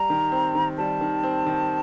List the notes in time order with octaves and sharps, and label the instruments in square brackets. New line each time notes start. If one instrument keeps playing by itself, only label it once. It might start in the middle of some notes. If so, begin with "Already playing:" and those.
Already playing: [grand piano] G3 [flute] A#5
[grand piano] D#3
C4
D#3
[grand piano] G3 [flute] A5
[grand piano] D#3
C4
D#3